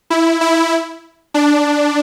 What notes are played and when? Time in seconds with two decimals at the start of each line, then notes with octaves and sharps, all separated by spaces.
0.10 E4
0.41 E4
1.34 D4